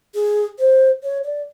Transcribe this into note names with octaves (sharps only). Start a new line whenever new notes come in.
G#4
C5
C#5
D5